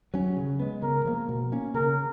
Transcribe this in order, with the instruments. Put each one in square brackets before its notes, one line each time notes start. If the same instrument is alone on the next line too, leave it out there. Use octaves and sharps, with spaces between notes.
[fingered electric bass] F#3 C#4
C#3
G#3 B3
[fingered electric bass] C#3 [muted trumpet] A#4
[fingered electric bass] F3 A#3
B2
A#3 C#4
[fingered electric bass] C#3 [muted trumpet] A#4